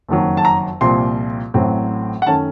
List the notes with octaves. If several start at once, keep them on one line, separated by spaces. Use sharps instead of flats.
F#1 F2 D#3 F#3
A5
A#5
C2 A#2 F3 C4 C6
A1 A2 F#3 C4
F#5
F#2 D#3 A3 C#4 A5